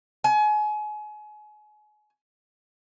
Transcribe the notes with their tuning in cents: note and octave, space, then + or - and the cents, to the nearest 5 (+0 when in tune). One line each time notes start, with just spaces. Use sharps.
G#5 +30